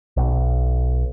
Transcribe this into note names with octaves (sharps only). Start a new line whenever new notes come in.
B1